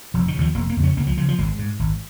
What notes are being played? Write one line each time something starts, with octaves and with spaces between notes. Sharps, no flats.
F1 F3
D#3
C#3
D#2 F3
F1 A#3
A#3
F2 C#3
C#4
C#2 A#3
F3
C#3 F3
F3
G#1 G#3
G#2
G#1